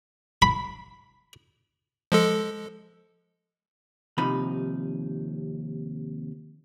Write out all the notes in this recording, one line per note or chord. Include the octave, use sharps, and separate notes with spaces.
B5
F3 G#3 A4
D#2 C3 F3 D#4 B5